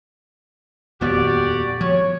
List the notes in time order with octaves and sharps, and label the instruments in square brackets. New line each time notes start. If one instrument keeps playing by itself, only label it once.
[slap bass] D#1 F2 B3 [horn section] F#4 G4 D5
[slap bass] F3 [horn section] C#5